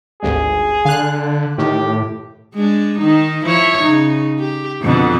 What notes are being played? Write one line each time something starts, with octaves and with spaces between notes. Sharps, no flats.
G#1 D2 G2 G#4
D3 F5 F#6
A2 D#3 G4
G#3 D4
D#3 D#4
F3 E4 C#5
C#3 D#4
G4
F2 B2 D3